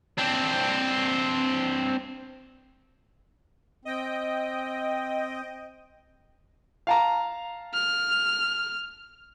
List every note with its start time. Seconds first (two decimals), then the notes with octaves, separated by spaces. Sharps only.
0.18 C4 D4
3.85 C4 D#5 G5
6.87 F5 A5 A#5
7.74 F6